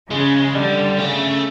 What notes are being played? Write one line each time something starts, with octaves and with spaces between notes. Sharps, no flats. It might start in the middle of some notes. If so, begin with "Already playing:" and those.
C#3 G#3
D3 G3
C#3 A3